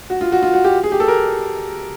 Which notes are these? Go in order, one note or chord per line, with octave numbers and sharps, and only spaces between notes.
F#4
F4
F#4
F4
F#4
G4
G#4
G4
A4
A#4